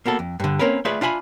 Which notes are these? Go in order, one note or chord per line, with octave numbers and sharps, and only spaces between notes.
A#3 B3 F#4 A4
F2
G2 D3
A#3 C4 C#4 A#4 B4
A3 F4 G#4 B4 D5 E5
D4 F4 E5 G#5 B5